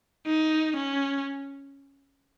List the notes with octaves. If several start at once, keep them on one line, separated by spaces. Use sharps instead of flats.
D#4
C#4